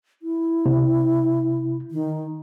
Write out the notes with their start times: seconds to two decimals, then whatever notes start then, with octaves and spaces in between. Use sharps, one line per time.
0.22 E4
0.66 C3
1.91 D#3